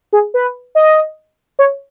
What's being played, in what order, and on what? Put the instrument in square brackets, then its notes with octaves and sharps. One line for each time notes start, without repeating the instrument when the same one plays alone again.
[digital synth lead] G#4
B4
D#5
C#5